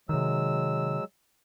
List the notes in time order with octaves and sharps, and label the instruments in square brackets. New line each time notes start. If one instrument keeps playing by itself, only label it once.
[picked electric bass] C3 D#3 [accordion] F#3 G#3 E6